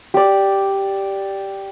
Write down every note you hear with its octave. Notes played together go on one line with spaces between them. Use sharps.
G4 D5